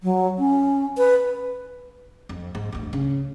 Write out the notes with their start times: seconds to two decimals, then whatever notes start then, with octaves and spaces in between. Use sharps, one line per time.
0.03 F#3
0.38 C#4
0.98 B4
2.29 F2
2.55 G#2
2.72 D#1 D2
2.93 C#3